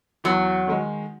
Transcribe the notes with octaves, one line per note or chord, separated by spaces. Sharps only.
E2 F#3
D#3 G#3